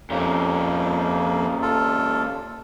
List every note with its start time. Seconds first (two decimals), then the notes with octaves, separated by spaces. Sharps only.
0.10 F2 A#2 A#3 C#4
1.62 F4 A4